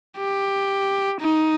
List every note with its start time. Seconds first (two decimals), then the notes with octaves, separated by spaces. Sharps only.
0.17 G4
1.21 D#4